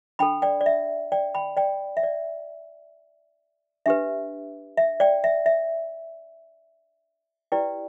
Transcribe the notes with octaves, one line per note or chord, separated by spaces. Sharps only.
D4 A4 G5 B5
D5 G5
D5
E5
D5 G5
G5 B5
D5 G5
E5
D5
D4 G4 B4 E5
E5
D5 G5
E5
E5
E4 G4 B4 D5 G5